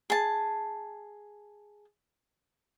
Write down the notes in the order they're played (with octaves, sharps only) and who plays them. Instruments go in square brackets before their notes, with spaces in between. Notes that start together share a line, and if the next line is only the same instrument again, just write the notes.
[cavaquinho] G#4 A5